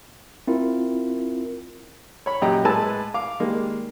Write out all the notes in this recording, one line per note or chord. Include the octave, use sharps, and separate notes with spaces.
C4 E4 F4 A#4
C#5 B5
F#2 A#2 G4 D#5 G5 A#5
A2 G#3 B4 G#5 A5 E6
F5 D6
D#3 G3 G#3 A#3